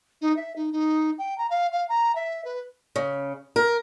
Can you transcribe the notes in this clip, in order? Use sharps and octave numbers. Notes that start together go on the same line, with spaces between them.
D#4
E5
D#4
D#4
G5
A#5
F5
F5
A#5
E5
B4
C#3
A#4